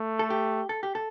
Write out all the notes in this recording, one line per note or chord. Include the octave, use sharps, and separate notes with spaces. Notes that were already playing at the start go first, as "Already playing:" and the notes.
Already playing: A3
A4
G4
A4
G4
A4